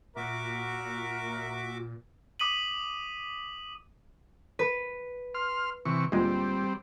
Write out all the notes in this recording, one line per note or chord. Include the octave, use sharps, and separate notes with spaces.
A#2 F#4 A#4 E5 D6
D6 D#6 B6 D#7 F#7
B4
C6 F6
C3 E3 C#6
D2 A#2 G3 G#3 C4